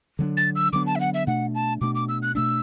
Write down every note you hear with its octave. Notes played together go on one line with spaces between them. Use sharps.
D3 F#3 B3 D4
A6
E6
D3 F#3 B3 D4 D6
A5
E5
F#5
E5
B2 A3 D4 F#5
A5
B2 A3 D4 D6
D6
E6
F#6
B2 A3 D4 E6